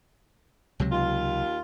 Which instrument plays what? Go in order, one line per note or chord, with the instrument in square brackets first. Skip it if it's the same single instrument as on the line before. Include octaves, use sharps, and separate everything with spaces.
[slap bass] C#2 C3 F#3
[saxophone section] D#2 F4